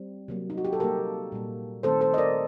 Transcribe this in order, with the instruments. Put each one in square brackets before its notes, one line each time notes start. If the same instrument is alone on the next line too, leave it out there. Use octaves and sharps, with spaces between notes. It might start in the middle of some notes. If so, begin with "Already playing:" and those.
Already playing: [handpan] G3 C4
C3 F#3 A#3
D#4
F#4
G4
A4
C3 G3 A#3 G4 A#4
A#2 G3 A#3
D#3 A3 C4 A4 C5
A4 C5
D#5
A#4 D5